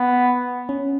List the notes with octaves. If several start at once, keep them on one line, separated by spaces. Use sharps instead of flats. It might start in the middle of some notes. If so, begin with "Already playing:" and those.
Already playing: B3
C#4